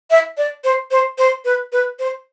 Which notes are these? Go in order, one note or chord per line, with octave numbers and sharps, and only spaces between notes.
E5
D5
C5
C5
C5
B4
B4
C5